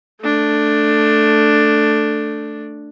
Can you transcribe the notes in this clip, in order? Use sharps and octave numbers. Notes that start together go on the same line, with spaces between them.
A3 D4